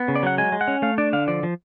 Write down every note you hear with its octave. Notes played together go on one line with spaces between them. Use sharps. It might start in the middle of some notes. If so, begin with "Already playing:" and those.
Already playing: B3
C#3
D5
F#3 F#5
G#3 G#5
G#3
F#5
C#4
A3 F5
D4 D5
D3 F5
F3 D5
F3